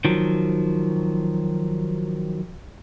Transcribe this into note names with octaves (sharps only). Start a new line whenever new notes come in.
D#3 F3 F#3